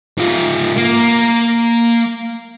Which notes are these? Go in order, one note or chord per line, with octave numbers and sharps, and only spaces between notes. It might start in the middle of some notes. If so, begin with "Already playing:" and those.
G#2 F4
A#3